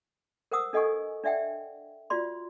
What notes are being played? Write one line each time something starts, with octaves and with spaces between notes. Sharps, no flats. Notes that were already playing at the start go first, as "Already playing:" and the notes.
A#4 C5 F#5 D#6 E6
D4 A4 D#5 F#5 G#5 C#6
D4 D5 E5 F#5 G5
F4 F#4 D5 C6